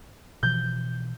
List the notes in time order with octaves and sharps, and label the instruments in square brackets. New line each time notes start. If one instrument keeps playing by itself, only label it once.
[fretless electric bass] B2 E3 F3 [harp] G6